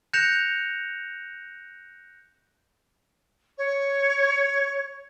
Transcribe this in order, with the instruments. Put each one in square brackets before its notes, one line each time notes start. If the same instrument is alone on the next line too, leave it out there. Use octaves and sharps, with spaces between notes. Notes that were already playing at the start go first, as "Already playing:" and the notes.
[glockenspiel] F#6 G6 A#6 C#7 E7 F7
[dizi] C#5